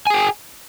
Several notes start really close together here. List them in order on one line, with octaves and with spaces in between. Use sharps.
G#5 G#4 G5